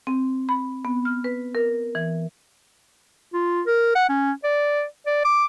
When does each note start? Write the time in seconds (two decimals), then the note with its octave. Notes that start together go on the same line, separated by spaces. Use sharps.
0.07 C4
0.49 B5
0.85 B3
1.05 F6
1.24 B4
1.55 A#4
1.95 E3
3.33 F4
3.67 A#4
3.95 F#5
4.09 C#4
4.44 D5
5.07 D5
5.25 D6